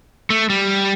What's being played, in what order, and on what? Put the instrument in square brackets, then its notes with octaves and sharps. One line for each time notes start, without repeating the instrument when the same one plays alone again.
[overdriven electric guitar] A3
G3